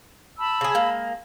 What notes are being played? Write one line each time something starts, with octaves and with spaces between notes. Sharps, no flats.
A5 B5 E6
C#3 G#4
G#3 A#3